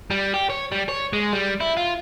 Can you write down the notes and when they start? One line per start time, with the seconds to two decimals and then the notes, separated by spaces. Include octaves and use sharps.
0.11 G3
0.34 G4
0.50 C#5
0.72 G3
0.89 C#5
1.13 G#3
1.33 G3
1.61 E4
1.77 F4